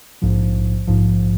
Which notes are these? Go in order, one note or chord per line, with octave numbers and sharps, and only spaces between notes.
A#1 G#2 F3
A#1 G#2 F3